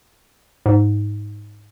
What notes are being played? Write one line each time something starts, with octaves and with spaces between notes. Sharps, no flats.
G#2